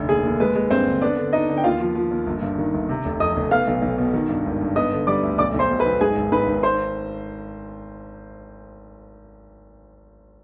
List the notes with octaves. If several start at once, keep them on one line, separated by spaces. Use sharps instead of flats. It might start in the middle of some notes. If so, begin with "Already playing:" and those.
Already playing: F1 D3
D#2 G#4
D#2
G#3 B4
G#3
G2 C4 C5
D3
B3 D4 D5
D3
D3 D#4 D#5
D3
G5
D#2 F4 F5
F3
F3
D#2
G1
G2
D#3
G1
C3
F1
F2 D#5 D#6
F1
B3 F5 F6
B1
B1
B2
D#3
G2
G#1
G2
B3 D#5 D#6
D3
G3 D5 D6
D2
B1 D5 D6
B1
C5 C6
B2
B4 B5
B1
G#2 G#4 G#5
G#1
G#2 B4 B5
G#1
C5 C6